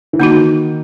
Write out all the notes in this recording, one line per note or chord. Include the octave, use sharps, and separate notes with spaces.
E3
D#3 A#3 D#4 F#4